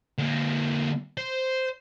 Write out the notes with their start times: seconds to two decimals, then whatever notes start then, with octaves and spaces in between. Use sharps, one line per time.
0.18 D3 A#3
1.18 C5